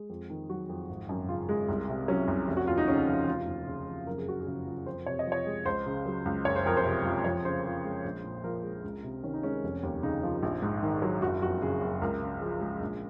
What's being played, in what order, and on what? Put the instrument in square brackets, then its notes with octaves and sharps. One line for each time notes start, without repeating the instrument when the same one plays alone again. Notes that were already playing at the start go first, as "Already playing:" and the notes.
Already playing: [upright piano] G#3
F2
D#3
F#3 F#4
F2
G#1
F#2
C#3 F4
G#3
C2
C3
F#3 C#4
C2
F1
F#4
D#2 F4
D#4
C#3 C#4
F3
F1 F4
D#2
C#3
F1
F#1 A#4
G#4
F2 F#4
G#4
C#3
F3
F2 C5
C3 C#5
D#5
F3
C#5
G#3
C#2 C5
C#3
F#3
C#2
F#1 C#5
C5
F2 A#4
C5
C3
F3
F2 C#5
C#3 C5
F3
G#3
A#1
A#2
F3 A#4
G#3
C#2
C3
D#3 C#4
D#4
G#3 C#4
F1
D#2
C#3 D#4
F3
A#1
G#2
D#3
F#3
F#1 F#4
F2 F#4
C#3 G#4
F#1
C#2 A#4
C#3
F3 G#4
G#3
A#1